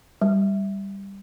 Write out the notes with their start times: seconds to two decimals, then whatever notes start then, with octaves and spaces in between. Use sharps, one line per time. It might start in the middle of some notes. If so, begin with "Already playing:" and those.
0.22 G3